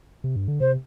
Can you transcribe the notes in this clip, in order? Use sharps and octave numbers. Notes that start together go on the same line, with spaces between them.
C3
G2
D3
C3 C5